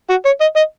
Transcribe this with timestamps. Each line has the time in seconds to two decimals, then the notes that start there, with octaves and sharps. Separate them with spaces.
0.10 F#4
0.25 C#5
0.41 D#5
0.56 D#5